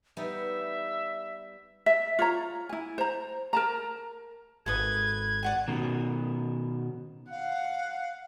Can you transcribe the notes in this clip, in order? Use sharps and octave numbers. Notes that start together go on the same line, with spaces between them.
G3 B3 D#4 E5
E5
F4 C#5 A#5
E4 G#5
C5 A#5
A#4 A5 A#5
G#1 A4 B4 D#6 G#6
D5 F#5 G#5
B2 D#3
F5 F#5